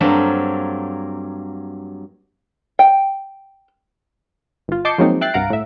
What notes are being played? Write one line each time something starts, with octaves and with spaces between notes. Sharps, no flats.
G2 F#3 A#3 C4 A4
G5
G1 F4
D#5 A5 D6 G6 C7 C#7
F3 F#3 G#3 A#3 C4 D#4
E5 G5 F#6 A6 C7
C2 G2 F5 F#5 A#5 D7
A2 E5